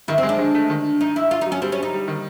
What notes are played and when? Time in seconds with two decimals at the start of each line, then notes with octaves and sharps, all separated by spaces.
0.08 D#3 E4
0.18 C4
0.23 G#3
0.29 D4
0.39 G#3
0.55 A3
0.70 D#3
1.01 D#4
1.16 E4
1.31 F4
1.41 F#3 D#4
1.52 C#4
1.62 G3 C4
1.72 C#4
1.78 G3
1.83 D#4
1.93 G3
2.08 D#3